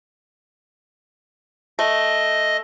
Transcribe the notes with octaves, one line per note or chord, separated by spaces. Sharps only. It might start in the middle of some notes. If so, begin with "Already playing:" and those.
A3 D#5